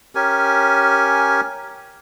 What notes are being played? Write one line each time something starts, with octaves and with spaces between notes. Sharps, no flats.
C#4 G4 A#4 G#5